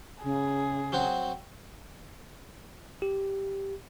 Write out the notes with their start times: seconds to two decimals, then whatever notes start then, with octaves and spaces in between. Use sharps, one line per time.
0.24 C#3 G#4
0.92 F#3 C4 F#4
3.02 G4